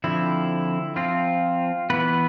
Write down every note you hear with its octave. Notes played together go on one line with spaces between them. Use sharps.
D3 F3 C4 E4
F3 C4 F4
E3 B3 B4